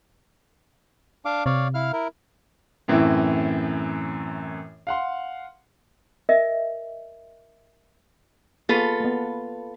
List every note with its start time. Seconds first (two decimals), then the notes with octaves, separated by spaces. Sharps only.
1.25 D4 F5 D6
1.46 C3 C#5 D5 F5
1.74 E4 F5 F6
1.93 E4 A#4
2.88 F#2 A2 E3 C4 E4
4.87 F5 F#5 C6
6.29 A#4 D#5 E5
8.69 A#3 B3 F4 G#4 A4 B4
9.00 A#3 B3